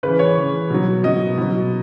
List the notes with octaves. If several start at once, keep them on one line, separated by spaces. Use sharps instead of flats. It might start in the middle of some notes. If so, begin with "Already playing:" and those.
C#3 E3 B4
C#5
C#3 E3
B2 F#3
B2 F#3 D#5
B2 F#3